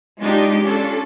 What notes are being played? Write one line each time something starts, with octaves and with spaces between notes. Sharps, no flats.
G#3 D4 D#4 F4 G4
C#4 D4 F4 A4